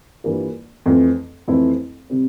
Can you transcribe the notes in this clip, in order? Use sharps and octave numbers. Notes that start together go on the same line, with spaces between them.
G2 E3 G3 A#3 F4
F2 E3 A3 C4
F2 E3 A3 C4 E4
C3 G3 C4